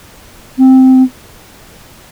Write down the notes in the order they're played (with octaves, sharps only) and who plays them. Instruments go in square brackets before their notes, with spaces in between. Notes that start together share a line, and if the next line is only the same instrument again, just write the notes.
[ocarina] C4